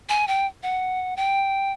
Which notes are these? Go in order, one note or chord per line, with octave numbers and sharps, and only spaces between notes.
G#5
G5
F#5
G5